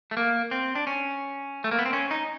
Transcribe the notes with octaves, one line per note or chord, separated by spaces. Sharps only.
A3
A#3
C4
D4
C#4
A3
A#3
B3
C4
C#4
D#4